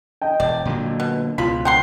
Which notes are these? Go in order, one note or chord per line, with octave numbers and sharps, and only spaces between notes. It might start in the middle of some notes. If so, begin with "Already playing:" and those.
D#5 G5
E1 D5
A#2 D3 F#3
B2
C#2 B2 F4 B5
C5 F#5 G5 B5 C6